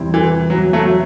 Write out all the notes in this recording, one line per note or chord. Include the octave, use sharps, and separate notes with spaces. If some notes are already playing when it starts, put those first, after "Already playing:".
Already playing: E2 C3 G3 C4 E4
E3
F#3
F#3 A3